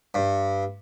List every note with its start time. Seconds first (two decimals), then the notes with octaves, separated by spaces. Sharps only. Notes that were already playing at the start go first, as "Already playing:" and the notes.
0.14 G2